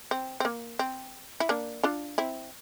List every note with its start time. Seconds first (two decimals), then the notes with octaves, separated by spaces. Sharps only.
0.11 C4
0.40 C4
0.45 A#3
0.79 C4
1.40 E4
1.49 A#3 D4
1.83 D4 F4
2.18 C4 E4